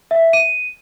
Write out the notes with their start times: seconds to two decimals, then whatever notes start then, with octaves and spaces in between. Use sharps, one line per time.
0.11 E5
0.33 D#7